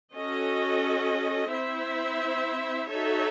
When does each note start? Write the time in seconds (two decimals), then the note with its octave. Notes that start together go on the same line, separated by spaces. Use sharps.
0.14 C#4 F#4 A4 D#5
1.51 C4 E4 C5 E5
2.88 D#4 F#4 A4 C#5 E5